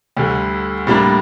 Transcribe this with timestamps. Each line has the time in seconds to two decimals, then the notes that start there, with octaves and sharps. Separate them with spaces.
0.17 D2 D3 G3
0.87 A2 G3 A#3 D4